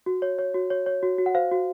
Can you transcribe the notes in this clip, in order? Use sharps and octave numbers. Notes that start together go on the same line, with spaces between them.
F#4
C#5
C#5
F#4
C#5
C#5
F#4
F#4
F#5
C5 F5
F#4